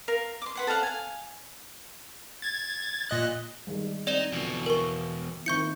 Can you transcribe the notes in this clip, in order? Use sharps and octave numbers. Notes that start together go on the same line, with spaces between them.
A#4 F5
C6 D6
B4 F#5 C6
A4 C5 F5 F#5
F5 G#5
G#6 A6
A#2 D#5 F#6
D#3 G3 G#3
C4 D#4 D5 E7 G7
E2 B2 D3 F3
A#4 C#6
D#3 C4 E4 C#6 G6 C#7